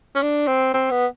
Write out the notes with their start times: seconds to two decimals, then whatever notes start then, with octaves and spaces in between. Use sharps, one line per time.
0.16 C#4
0.22 D4
0.48 C4
0.74 C4
0.91 B3